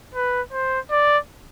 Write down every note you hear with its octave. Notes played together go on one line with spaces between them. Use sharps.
B4
C5
D5